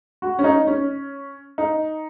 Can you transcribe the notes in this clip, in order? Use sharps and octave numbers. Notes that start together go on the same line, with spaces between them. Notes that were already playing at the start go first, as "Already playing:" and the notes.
F#4
C#4
D#4
C#4
D#4